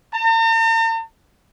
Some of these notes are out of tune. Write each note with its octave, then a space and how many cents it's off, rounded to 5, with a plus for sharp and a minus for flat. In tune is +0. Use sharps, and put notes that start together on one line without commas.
A#5 -45